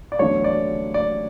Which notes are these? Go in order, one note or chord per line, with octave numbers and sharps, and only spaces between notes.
D5
E2 D3 F#3 A3 C#5
D5
D5